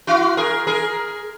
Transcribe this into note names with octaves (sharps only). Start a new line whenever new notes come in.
E4 F#4
G#4 A#4
G#4 A#4